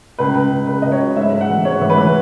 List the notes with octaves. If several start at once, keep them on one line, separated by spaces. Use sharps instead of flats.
C#2 B4
C#2
C#2
C#3 B4
C#2 D#5
C#5
F#3
G#2 E5
G#2
F#5
E3
G#2 C#5
E3
B4
E3